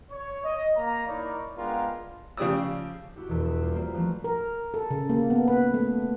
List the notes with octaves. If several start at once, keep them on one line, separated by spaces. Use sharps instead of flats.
C#5
D#5
A#3 A#5
D#4 E4 A#4 C#5 D5
G#3 B3 D4 F4 A#4 G5
C#3 F3 G4 D5 D#6 E6
E4 F#4 G4
E1 E2
E5
G3 F4 G4
A#3 C4 E4 F4
E3 F3 A3 C4 E4 F#4
A#4
A4
C#3
A#3
B3
B4
A3